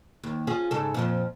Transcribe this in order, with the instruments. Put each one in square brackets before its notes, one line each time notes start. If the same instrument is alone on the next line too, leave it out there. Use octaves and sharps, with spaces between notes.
[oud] D#2
C#4 F4 G#4
G#2 C#3 A4
F2 A#2 F3